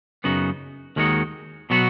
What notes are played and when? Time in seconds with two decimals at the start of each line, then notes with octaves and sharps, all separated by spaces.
0.24 F#2 C#3 B3 D#4 F#4
0.96 D#2 D#3 G#3 D#4 F#4
1.70 B2 F#3 B3 F#4